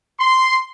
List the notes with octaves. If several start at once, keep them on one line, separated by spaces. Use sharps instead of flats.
C6